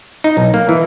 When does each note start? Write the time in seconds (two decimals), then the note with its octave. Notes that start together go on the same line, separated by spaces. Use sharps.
0.24 D#4
0.37 B1
0.54 A#3
0.69 E3